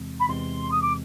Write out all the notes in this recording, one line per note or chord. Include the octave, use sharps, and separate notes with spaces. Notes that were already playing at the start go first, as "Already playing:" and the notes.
Already playing: E2 C3 E3 G#3 C4
B5
E2 C3 E3 G#3 C4 C6
D#6
D6